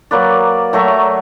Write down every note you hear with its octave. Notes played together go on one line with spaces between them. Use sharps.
F#3 A#3 B4 D5
F#3 A3 E5 A#5